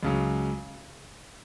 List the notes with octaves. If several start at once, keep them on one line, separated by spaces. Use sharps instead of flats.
C#2 C#3 F#3